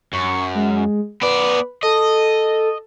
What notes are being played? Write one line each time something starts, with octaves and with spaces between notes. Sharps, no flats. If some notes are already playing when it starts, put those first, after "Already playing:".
F#2 C#6
G#3
B3 B4 D5
A4 D#5